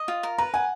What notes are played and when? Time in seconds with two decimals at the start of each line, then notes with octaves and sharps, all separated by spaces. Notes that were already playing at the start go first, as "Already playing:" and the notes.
Already playing: D#5
0.08 F4
0.23 A#4
0.38 B4 A#5
0.54 F#5 G#5